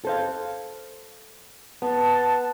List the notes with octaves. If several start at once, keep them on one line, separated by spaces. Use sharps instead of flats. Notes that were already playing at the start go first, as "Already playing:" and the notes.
A4 C5 F5
B3 A5